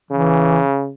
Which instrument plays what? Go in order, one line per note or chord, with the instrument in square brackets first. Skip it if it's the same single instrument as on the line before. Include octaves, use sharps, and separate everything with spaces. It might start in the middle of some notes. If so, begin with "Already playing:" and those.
[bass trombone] C#3 [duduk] E3